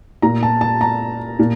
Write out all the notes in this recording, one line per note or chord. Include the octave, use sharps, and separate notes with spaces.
A#2 A#5
A5
A5
A#5
A#2